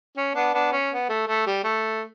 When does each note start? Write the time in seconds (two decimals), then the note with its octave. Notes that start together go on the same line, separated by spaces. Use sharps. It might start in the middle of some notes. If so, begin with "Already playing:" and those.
0.17 C#4
0.35 B3 D4
0.53 B3 D4
0.72 C#4
0.91 B3
1.09 A3
1.27 A3
1.46 G3
1.64 A3